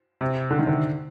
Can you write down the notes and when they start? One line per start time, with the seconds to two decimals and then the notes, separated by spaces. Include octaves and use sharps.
0.21 C3
0.51 D3
0.59 D#3
0.67 D3